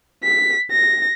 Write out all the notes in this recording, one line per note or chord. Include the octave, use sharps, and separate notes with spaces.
B6
A#6